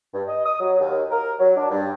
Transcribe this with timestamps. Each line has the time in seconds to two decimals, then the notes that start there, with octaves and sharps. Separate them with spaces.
0.13 G2
0.27 D#5
0.45 D#6
0.60 F#3
0.80 D#2
1.10 A#4
1.39 F#3
1.57 D4
1.71 G2